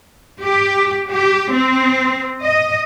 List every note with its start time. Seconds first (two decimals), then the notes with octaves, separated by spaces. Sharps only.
0.41 G4
1.09 G4
1.53 C4
2.43 D#5